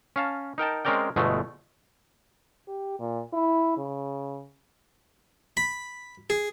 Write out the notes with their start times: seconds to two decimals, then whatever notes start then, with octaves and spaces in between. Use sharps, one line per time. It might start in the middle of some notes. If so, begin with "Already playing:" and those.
0.16 C#4 F5 A5
0.58 D#4 A#4 G5 A5
0.85 G#3 C4 C#4 A#4 D5 G5
1.16 G1 B2 G#3 A3
2.67 G4
2.99 A#2
3.33 E4
3.77 C#3
5.57 B5
6.30 G#4